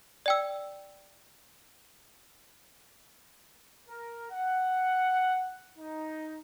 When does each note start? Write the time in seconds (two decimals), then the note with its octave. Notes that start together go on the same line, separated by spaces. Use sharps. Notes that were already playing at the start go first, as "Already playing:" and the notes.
0.26 D5 G5 E6
3.89 A#4
4.31 F#5
5.78 D#4